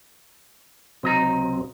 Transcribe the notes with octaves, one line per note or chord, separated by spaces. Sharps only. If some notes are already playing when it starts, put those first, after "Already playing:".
C#2 C3 F#3 C4 D#5 A#5